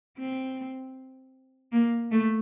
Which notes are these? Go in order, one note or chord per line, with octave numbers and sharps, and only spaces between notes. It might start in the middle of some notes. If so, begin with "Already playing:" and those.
C4
A#3
A3